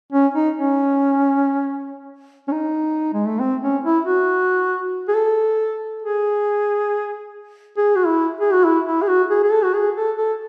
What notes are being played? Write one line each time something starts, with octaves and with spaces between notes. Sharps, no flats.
C#4
D#4
C#4
C#4
D#4
G#3
A3
C4
C#4
E4
F#4
G#4
A4
G#4
G#4
F#4
E4
G#4
F#4
E4
E4
G#4
F#4
G#4
G#4
A4
F#4
G#4
A4
A4